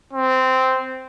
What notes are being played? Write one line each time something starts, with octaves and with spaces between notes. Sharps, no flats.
C4